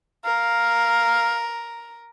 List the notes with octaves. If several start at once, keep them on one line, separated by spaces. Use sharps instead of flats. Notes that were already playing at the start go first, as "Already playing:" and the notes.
A#4 F5